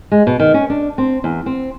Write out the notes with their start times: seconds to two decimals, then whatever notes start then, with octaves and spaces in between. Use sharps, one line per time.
0.12 G#3
0.27 B2
0.40 D#3
0.54 C#4
0.70 D4
0.98 C4
1.24 E2
1.46 C4